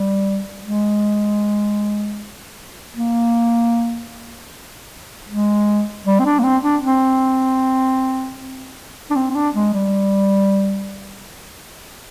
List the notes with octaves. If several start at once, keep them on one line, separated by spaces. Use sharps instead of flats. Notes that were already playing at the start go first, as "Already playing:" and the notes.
Already playing: G3
G#3
A#3
G#3
G3
C4
D4
A#3
C4
D4
C4
D4
C4
C4
D4
G#3
G3